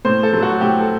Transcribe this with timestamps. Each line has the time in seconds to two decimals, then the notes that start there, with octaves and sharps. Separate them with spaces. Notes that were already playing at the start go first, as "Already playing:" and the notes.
0.05 A2 C5
0.23 A4
0.33 F#3 A3
0.42 F#4
0.61 A2 G4
0.80 A4